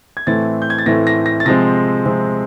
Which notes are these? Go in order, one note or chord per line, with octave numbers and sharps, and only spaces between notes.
G#6
A2 E3 A3 C4 A6
G6
G#6
A6
A2 E3 A3 C4 A#6
A#6
A#6
A6
C3 F3 G#3 C4 A#6
C3 F3 G#3 C4